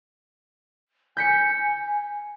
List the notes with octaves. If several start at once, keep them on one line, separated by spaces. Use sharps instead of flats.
G#5 G6 B6 C#7